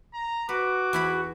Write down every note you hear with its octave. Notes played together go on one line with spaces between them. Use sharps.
A#5
F#4 B4 D6
E2 E4 B5